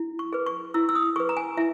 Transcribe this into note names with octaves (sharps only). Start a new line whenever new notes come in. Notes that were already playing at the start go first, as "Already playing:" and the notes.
Already playing: E4
C#6
G#4 B4
C#6
E4 E6
E6
D#6
G#4 B4 C#6
A#5
G#5
E4 E5